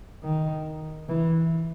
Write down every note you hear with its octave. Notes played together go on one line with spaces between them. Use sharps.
D#3
E3